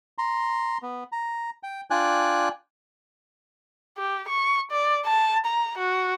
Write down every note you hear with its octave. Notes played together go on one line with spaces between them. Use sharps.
A#5 C6
B3
A#5
G5
D4 F4 D5 G5 G#5 F#6
G4
C#6
D5
A5
A#5
F#4